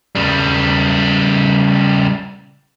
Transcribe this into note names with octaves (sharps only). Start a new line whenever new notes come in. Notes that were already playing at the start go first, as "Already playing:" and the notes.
C#3 G3